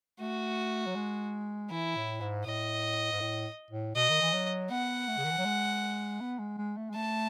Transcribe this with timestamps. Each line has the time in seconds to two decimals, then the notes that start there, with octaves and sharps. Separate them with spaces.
0.21 A3 F#4
0.86 F#3
0.96 G#3
1.70 E3 E4
1.96 A2
2.21 G#2
2.46 A2 D#5
3.12 G#2
3.21 A2
3.71 A2
3.95 B2 D#5
4.09 D#3
4.21 E3
4.33 F#3
4.70 B3 F#5
5.08 A3
5.17 C#3
5.25 D#3
5.31 E3
5.38 F#3
5.45 G#3
6.21 B3
6.39 G#3
6.58 G#3
6.77 A3
6.90 G#3
6.96 A3 A5